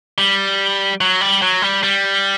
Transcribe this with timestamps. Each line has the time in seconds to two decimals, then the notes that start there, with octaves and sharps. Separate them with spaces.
0.18 G3
1.01 F#3
1.21 G3
1.42 F#3
1.62 G3
1.83 G3